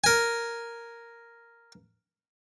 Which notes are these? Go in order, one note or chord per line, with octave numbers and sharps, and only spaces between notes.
A#4 G#5